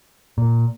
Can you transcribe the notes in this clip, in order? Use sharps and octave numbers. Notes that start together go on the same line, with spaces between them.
A#2